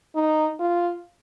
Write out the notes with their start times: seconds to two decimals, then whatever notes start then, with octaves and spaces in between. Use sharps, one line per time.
0.15 D#4
0.60 F4